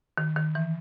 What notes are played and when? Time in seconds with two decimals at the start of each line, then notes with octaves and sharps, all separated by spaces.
0.18 D#3
0.36 D#3
0.55 E3